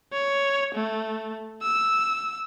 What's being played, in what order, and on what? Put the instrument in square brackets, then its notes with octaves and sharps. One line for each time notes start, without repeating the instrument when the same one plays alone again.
[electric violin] C#5
A3
E6